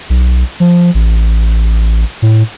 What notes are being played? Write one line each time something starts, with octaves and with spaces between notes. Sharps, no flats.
B1
F3
A1
A2